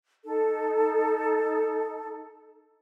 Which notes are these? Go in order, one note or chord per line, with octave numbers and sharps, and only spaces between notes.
D#4 A4